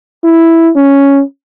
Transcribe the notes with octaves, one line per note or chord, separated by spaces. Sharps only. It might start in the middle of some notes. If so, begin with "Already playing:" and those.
E4
C#4